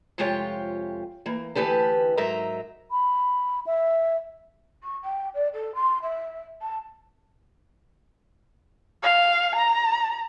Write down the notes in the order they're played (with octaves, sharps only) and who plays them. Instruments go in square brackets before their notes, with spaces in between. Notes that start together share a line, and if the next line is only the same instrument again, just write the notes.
[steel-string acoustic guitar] F2 C3 G#3 F4 G4 C#5
E3 A#3
D2 E3 G4 B4 A5
G#2 F#3 D#4 A#4 E5 A#5
[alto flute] B5
E5
[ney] C#6
G5
D5
A4
C6
E5
A5
[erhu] F5
A#5